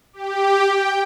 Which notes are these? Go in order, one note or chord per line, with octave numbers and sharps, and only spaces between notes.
G4
G5